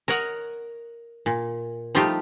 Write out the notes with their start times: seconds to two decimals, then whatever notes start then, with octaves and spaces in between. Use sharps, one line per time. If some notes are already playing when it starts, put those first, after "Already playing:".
0.08 A#4 C#5 D#5 F#5
1.26 A#2
1.95 F3 G3 A3 D#4 F4 G4